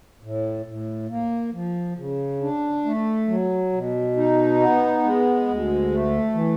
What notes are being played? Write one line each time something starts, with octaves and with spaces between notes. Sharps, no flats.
A2
A2
A#3
F3
C#3
D4
A3
F#3
B2
D#4
B3
G#3
D2
A3
E3